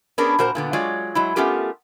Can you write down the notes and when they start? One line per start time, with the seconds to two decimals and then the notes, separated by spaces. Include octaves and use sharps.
0.18 B3 C#4 D4 G#4 A#4
0.38 A#2 F#4 A#4 C5 A#5
0.55 A#2 D3 B3
0.73 F#3 G#3 F4 C#5 D5
1.15 F#3 G#3 E4
1.36 A3 B3 C#4 F4 G4 A#4